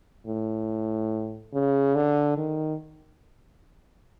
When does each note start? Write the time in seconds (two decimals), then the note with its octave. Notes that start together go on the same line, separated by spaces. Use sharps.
0.27 A2
1.54 C#3
1.95 D3
2.37 D#3